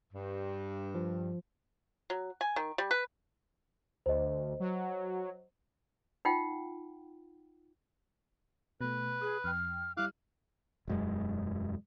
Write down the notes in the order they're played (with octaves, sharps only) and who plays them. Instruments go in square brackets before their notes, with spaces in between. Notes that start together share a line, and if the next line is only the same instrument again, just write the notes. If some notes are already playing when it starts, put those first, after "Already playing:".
[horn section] G2
[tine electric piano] F3
[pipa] F#3
G#5
D#3
G3
B4
[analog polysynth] D2 [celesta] C5 D#5
[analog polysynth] F#3
[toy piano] D#4 F4 F#5 G5
[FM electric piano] B2 A3 [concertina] B4
[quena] G#4 [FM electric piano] D#6 F#6
[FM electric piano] F2 G5 [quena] F6
[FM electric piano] G3 E4 [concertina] F5 D6 F#6 [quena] F6
[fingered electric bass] E1 F#2 G#3